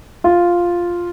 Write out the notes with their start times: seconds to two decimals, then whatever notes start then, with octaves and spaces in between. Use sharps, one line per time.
0.24 F4